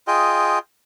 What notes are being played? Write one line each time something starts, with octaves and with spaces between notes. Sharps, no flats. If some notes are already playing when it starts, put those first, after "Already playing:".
F4 G#4 D#5 G5